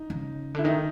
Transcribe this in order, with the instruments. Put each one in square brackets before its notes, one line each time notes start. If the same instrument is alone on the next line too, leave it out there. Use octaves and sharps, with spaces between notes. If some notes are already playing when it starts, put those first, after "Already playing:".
Already playing: [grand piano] D#4
[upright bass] C#3
[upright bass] D3 [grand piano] E4
[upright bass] D#3 [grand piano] D#4